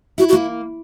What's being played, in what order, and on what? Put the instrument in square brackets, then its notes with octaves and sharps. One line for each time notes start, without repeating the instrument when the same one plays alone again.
[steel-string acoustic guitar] E4 [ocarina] F#4
[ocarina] F#4
[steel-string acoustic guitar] A#3